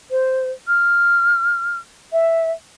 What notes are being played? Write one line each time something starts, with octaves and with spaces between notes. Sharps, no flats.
C5
F6
E5